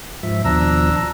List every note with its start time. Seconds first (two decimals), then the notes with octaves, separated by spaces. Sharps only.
0.23 G#2 F3 E5
0.44 D#2 B2 F3 D4 A#5 E6